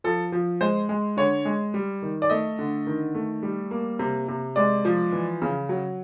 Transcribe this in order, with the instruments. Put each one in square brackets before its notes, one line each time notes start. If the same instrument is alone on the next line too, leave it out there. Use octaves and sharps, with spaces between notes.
[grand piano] F3 A4
F3
G#3 C5
G#3
D3 C#5
G#3
G3
D#3
D5
A3 D#5
D3
D#3
A3
G3
A#3
C3
C3
G#3 D5
F3
E3
C#3
F#3